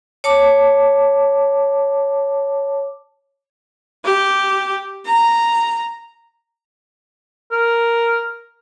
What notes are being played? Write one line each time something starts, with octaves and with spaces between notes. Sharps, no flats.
C#5 A5 D6
G4
A#5
A#4